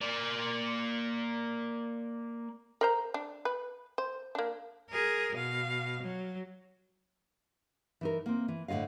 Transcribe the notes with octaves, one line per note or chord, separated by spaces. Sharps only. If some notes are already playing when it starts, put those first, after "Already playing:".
A#3 D5
A#4 C5 A#5
D4
B4
C5
A#3 D4
G#4 A#4
B2 F5
F#3
E3 D#4 A#4
A#3 C4
E3
A2 D3 F4 D#5 F5